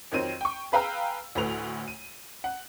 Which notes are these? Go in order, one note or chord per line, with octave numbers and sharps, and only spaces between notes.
F2 D#3 F#3 C4 D#7
G5 C#6
G#4 B4 F5 G5 A#5 E6
D2 A2 A3 B4 F7
D#7
F#5